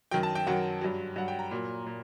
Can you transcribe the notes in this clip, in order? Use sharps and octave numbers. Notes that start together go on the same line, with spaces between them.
F#2 D#3 F#3 G5
A5
G5
F#2 D#3 F#3 F#5
G2 F#3
G2 F#3 F#5
G5
A#5
A#2 F#3
A#2